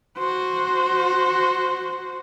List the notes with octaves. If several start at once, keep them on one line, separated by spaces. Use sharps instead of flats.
F#4 C5